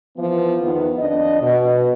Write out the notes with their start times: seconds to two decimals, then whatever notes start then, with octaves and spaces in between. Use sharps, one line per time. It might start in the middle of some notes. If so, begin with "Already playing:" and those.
0.17 E3 F3 B3
0.62 E2 D#3 B3
0.99 F2 D4 D#5
1.41 B2